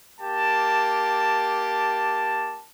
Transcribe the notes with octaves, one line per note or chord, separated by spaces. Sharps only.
A#3 G4 A5